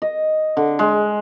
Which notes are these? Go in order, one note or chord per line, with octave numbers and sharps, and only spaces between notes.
D#5
D3
G#3